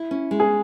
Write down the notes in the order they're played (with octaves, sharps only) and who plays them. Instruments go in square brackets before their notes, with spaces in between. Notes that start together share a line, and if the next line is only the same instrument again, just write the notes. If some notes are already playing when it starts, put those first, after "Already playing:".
Already playing: [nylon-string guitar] E4
C#4
G#3
[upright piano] G#4